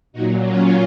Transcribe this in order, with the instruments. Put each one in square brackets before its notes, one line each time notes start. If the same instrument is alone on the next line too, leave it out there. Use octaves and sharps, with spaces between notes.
[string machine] A#2 F#3 D#4 F#4
C#4 F4